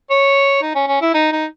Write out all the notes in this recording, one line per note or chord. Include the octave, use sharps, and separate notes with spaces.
C#5
D#4
C#4
C#4
E4
D#4
D#4